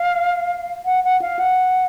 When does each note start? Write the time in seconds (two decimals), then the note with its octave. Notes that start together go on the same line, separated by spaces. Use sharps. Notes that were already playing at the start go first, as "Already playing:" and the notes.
Already playing: F5
0.85 F#5
1.04 F#5
1.22 F5
1.39 F#5